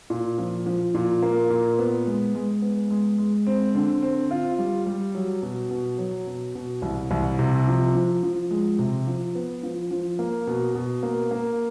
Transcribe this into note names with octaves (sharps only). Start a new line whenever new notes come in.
A#2
F3
F3
A#2
A#3
A#2
B3
G#3
G#3
B3
G#3
G#3
C4
D3
C4
F4
G3
G3
F#3
B2
B2
F#3
B2
B2
C2
C2
C3
F3
F3
F3
G#3
C3
F3
B3
F3
F3
A#3
B2
B2
A#3
A#3